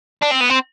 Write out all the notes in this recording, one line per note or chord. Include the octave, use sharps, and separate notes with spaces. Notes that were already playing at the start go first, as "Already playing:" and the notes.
D4
C4
B3
C4